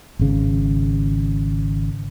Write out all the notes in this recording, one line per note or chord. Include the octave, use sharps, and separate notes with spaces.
G#1 C#3